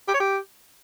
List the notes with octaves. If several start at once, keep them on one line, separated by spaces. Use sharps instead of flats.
G4
C#5
G4